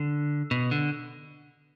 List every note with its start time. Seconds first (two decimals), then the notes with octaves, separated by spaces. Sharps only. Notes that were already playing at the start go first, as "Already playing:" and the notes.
Already playing: D3
0.51 B2
0.71 D3